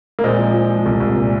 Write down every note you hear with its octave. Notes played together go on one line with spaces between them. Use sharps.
A#3
A#2 G#3 C4
F3
F3
F3
C2
C2
A#2